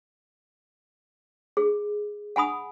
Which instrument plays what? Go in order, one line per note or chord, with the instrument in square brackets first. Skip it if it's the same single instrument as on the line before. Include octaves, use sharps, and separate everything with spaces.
[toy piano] G#4
F#5 G#5 B5 D#6